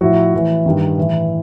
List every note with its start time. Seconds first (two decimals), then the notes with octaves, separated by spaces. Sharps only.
0.01 A2 F3 E4 F#4
0.34 A2 E3
0.66 G2 D#3
0.98 A2 E3